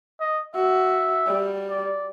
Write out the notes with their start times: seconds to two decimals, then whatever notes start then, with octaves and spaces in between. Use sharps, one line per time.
0.20 D#5
0.55 F#4 E5
1.27 G3
1.70 D5